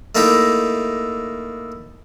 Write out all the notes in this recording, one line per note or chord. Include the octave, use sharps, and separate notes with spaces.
A3 A#3 D#4 E4 G4 A#4